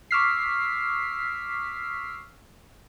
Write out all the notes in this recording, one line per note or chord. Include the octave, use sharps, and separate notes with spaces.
C#6 D6 E6 F6 B6 C7